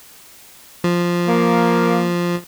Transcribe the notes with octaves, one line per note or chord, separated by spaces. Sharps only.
F3
A#3